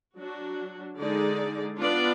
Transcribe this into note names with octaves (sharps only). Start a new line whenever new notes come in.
F#3 D4 F#4
D3 G#3 D#4 G#4 D5
B3 D4 F4 B4 D5